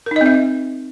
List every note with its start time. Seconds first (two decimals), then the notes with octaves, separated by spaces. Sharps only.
0.06 A#4
0.11 D#4
0.16 D#5
0.21 C4
0.26 E5